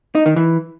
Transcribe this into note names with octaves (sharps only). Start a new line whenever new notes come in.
D#4
D#3
E3